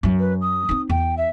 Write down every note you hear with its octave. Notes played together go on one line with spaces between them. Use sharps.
F#2 F#3
B4
D#6
C4 D#4
E2 G5
E5